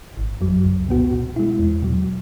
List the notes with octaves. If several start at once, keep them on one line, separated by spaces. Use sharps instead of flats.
G#1
F#2 F#3
C#2
B2 B3 F#4
B2
G#3 E4
E2
B2 F#3